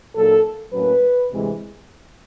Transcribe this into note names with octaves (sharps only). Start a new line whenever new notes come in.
A#2 F#3 A#3 D#4 A4
A2 F#3 A#3 C#4 B4
D2 C3 E3 G#3